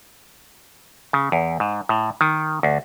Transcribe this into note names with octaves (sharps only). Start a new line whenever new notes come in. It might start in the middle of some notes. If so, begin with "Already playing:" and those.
C#3
E2
G#2
A2
D#3
D2